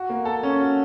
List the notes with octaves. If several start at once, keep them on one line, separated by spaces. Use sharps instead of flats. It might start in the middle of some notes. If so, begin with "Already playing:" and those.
Already playing: F#4
A#3
A4
C#4
F#4